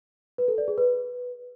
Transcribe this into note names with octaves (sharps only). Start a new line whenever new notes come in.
B4
A4
D5
G#4
B4